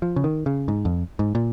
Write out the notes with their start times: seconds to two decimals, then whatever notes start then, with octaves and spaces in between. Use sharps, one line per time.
0.02 F3
0.16 C#3
0.24 D#3
0.46 C#3
0.68 G#2
0.85 F2
1.19 G#2
1.35 A#2